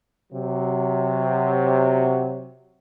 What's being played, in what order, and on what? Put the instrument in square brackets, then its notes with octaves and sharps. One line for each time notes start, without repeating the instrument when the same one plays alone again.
[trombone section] C3 F#3